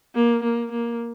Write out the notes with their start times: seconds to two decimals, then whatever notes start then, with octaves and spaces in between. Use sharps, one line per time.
0.15 A#3
0.43 A#3
0.71 A#3